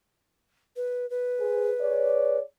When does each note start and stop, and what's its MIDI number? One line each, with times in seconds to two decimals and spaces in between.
0.76 1.08 71
1.10 2.38 71
1.39 1.70 68
1.39 1.70 72
1.80 2.40 68
1.80 2.40 73
1.80 2.40 74